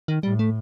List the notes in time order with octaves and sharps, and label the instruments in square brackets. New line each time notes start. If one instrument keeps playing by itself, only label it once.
[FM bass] D#3
[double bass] A2 [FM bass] G3
[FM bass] A3